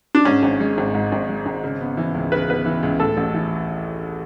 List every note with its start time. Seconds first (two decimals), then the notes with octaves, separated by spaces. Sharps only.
0.15 D4
0.25 G#2 C#4
0.43 G#1
0.60 G#3
0.78 G#1
0.94 G#2
1.12 G#1
1.29 G#3
1.46 G#1
1.64 C#3
1.81 B3
1.97 E3
2.14 C#2
2.32 C#3 B4
2.49 B3 B4
2.65 E3
2.83 C#2
3.00 A2 A4
3.17 A1
3.34 E3